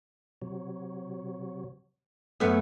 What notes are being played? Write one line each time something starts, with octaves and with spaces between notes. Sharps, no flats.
C3 F#3
F#2 A3 B3 G#4